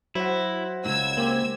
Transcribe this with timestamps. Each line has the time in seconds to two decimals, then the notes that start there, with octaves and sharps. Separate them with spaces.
0.15 F#3 E4 F#4 C5
0.85 C#2 G#2 E6 G#6
1.17 A#3 C4 G4 G#5